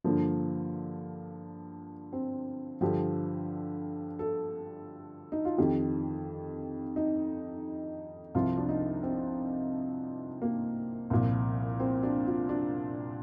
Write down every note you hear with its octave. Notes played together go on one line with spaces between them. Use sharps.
G2 D3 F3 A#3
C4
G2 D3 F3 G4
A4
D#4
F4
F2 D#3 G4
D#4
C2 C3 F3 F4
D4
D#4
C4
A#3
C2 A#2 F3
C4
D4
F4
D4